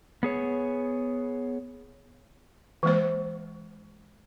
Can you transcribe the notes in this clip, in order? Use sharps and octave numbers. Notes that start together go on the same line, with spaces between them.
B3 G#4 C#5
E3 G#3 A#3 C5